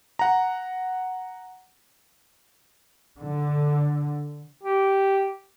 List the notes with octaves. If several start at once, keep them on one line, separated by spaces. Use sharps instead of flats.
F#5 A#5
D3
G4